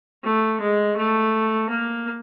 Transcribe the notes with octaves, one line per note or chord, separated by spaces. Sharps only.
A3
G#3
A3
A#3